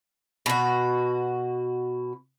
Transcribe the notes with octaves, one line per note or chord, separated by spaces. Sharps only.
B2 F#4